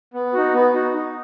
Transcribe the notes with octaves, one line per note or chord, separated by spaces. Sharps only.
B3
D#4 F#4
B3
D#4 F#4
D#4